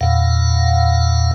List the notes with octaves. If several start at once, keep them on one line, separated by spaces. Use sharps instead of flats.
E2 A#2 F5 F#5